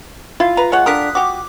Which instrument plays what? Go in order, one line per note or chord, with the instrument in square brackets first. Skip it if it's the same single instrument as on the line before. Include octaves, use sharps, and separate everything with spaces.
[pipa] E4 [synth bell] F4 F5
[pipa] B4 A#5
G#3 C#5 F#5
[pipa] D3 G4 A#4 [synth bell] D#6 F#6 B6
[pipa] F#4 G4 [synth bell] D6